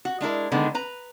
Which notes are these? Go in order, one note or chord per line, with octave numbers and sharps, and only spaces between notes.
F#4
G#3 D4 E4 A#4
D3 D#3 G#3 B3
B4 A#5